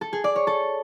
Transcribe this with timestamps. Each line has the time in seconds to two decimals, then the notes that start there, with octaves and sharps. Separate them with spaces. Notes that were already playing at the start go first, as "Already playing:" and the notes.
0.01 A4
0.13 G#4
0.24 D5
0.36 C#5
0.47 A4